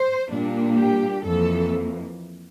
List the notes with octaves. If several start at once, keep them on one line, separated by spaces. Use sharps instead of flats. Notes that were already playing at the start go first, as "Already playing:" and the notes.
Already playing: C5
A#2 G3 A#3 D4
G4
F2 E3 A#3 A4